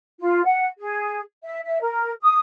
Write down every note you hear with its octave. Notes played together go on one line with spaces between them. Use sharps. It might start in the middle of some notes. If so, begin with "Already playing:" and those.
F4
F#5
G#4
E5
E5
A#4
D#6